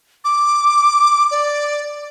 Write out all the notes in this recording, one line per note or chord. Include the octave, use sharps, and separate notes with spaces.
D6
D5